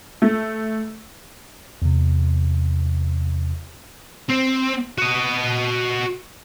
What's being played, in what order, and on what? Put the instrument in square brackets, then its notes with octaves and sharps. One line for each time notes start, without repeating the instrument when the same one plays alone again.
[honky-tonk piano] A3
[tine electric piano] E2 C3
[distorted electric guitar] C4
F#4 D#5